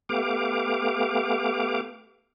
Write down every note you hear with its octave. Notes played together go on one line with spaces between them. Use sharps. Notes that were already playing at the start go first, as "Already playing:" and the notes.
A3 B3 G4 F5 D6